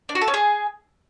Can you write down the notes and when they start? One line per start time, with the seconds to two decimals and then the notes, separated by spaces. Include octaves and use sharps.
0.09 D4
0.15 F#4
0.21 A4
0.28 C#4
0.34 G#4